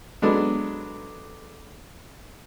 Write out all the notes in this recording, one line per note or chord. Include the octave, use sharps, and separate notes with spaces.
F#3 G#3 B3 D4 A4